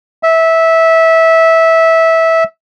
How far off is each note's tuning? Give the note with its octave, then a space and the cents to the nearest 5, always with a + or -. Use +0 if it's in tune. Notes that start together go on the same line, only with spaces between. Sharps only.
E5 -15